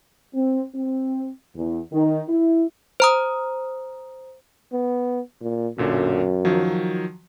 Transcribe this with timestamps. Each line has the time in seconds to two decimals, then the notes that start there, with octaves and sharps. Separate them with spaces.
0.35 C4
0.75 C4
1.56 E2
1.93 D#3
2.29 E4
3.00 C5 A#5 D#6
4.73 B3
5.41 A#2
5.78 B1 F#2 A#2 D3
6.45 D#3 F3 F#3